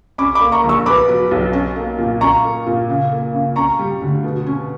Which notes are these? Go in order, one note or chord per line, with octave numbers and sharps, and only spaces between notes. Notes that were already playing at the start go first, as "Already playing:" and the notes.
C#4 B5 D6
B5 D6
A#3
A#5 C#6
A#1
C#6 E6
B3 B5 D6
F#3
B1
C#4
A#3
A#2
C#4 A#5 C#6
A#3
A#2
C#3
A#3
C#3
C#4 A#5 C#6
G3
D2
B2
C#4